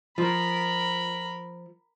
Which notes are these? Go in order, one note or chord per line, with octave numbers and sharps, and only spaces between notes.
F3 A#4 B5